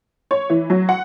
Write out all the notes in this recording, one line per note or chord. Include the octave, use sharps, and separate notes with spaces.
C#5
E3
F#3
F#5